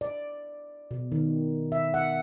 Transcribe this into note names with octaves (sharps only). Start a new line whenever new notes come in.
D5
B2
D#3
E5
F#5